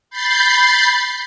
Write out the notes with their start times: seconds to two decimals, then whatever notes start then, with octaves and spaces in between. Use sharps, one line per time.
0.10 B5 G6 A6 C7